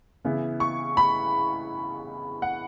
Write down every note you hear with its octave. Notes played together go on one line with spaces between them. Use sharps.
C#3 E3 B3 E4
C#6
B5
F#5